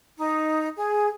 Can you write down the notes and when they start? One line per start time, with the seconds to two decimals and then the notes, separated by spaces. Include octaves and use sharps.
0.18 D#4
0.76 G#4